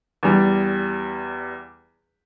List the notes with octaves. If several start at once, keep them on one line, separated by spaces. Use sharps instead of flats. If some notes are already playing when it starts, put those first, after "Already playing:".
E2 G3